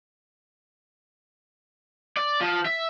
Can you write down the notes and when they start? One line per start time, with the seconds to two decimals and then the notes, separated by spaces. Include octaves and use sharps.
2.17 D5
2.41 F3
2.66 E5